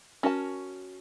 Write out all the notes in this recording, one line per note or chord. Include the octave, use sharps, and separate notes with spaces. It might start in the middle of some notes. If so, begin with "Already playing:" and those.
C#4 F#4 A#4 E5 A5